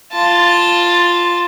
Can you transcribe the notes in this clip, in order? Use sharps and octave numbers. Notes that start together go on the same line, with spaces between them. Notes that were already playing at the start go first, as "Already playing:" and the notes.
F4 A5